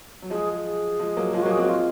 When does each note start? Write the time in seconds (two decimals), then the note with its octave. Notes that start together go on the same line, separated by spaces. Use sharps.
0.22 F#3
0.30 F3 G#3 G#4
0.65 G#4
0.99 F3 G#3
1.17 F#3 A#3
1.33 F3 G#3 F4
1.42 F#3 A#3 F#4
1.51 G#4
1.57 G#3 C4 F#4
1.69 F4